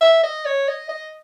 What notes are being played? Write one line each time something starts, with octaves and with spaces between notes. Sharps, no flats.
E5
D#5
C#5
D#5
D#5